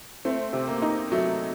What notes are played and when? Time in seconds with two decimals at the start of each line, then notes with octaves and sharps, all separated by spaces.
0.25 A3 C4
0.53 C3
0.67 A#3
0.82 D#4
1.12 F#3 A3